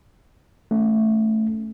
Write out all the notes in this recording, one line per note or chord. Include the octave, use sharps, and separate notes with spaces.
A3 C#4